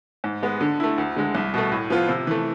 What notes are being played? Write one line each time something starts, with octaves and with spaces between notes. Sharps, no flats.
G#2
G#3 B3
D3
A3 E4
D2
D3 G#3
C2
B2 A3
A2
F3 B3 F4
C3
E3 A3